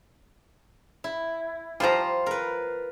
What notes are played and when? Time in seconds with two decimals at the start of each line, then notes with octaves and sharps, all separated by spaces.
1.04 E4
1.80 F3 G3 F4 C5 A#5
2.26 A#4 B4